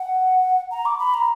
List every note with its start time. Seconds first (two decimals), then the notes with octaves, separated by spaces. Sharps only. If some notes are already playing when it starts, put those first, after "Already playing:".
Already playing: F#5
0.71 A#5
0.86 D6
0.99 B5
1.14 A#5